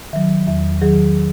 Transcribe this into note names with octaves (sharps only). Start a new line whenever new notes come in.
D#3 F#3 E5
E2 E5
D#3 F#3 G#4